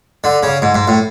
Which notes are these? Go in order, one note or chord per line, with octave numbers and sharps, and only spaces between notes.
D3
C#3
G#2
G#2
A2